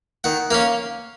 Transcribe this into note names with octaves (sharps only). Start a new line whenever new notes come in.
D#3 F#5
A#3 C#4 F5